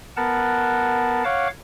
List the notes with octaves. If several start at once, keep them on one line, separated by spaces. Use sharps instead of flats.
B3 A#4 F#5 A5
C#5 F5 F#5 D6